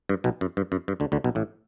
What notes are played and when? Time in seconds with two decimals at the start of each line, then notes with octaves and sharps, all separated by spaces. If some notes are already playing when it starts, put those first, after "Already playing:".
0.09 G2
0.24 B1 B2
0.41 F#2
0.57 G2
0.72 F#2
0.88 G2
1.00 D2 D3
1.12 D2 D3
1.24 B1 B2
1.35 A1 A2